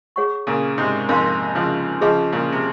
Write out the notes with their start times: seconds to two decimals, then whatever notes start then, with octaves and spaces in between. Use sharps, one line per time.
0.16 G#4 C#5 F#5 C#6
0.47 A#2 C#3
0.78 G#2 C3
1.09 F2 G#2 A#4 F5 C6
1.55 C#3 F3
2.01 C#3 F3 G#4 D#5 G#5
2.32 A#2 C#3
2.52 C3